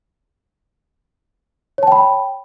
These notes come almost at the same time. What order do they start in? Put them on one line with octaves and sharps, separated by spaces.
C#5 A5 G5 B5